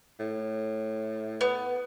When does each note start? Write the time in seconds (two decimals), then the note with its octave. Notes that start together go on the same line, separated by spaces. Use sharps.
0.19 A2
1.41 B3